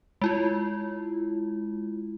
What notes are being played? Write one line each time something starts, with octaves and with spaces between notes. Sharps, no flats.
G#3 E4 F4